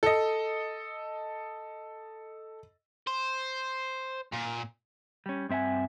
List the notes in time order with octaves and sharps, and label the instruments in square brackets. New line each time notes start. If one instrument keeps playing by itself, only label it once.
[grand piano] A4 D#5
[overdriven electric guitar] C5
A#2
[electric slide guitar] G3 C#4
G2 C4 E5 F#5 G#5